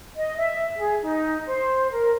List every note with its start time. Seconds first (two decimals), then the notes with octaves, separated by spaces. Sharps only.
0.17 D#5
0.37 E5
0.77 G#4
1.02 D#4
1.46 C5
1.91 A#4